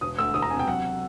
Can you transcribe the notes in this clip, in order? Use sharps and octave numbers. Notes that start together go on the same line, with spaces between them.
E1 D#6
D2 E6
E1 D#6
A#5
C3 G#5
G5
F#3 F#5